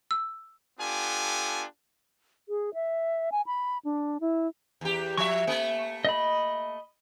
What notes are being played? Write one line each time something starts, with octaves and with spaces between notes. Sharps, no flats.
E6
B3 D4 F4 G4 A4 G#5
G#4
E5
G#5
B5
D4
E4
E2 G4
F3 E5 C#6
A3 A#3
D#5 B5